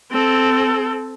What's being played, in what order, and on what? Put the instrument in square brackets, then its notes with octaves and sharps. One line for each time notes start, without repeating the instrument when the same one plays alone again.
[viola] C4 A4